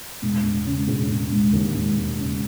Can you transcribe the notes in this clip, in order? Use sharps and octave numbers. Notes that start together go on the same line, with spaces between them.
E1
E1
C#3
E1
E1
E1
D#2
E1
E1
C#3